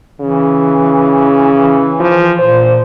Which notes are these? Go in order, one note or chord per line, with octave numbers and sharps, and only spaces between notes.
C#3 E3
E3
F3
A#2 C5